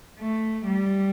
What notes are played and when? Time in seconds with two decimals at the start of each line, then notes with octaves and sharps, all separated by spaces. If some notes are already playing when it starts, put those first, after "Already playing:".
0.19 A3
0.66 G3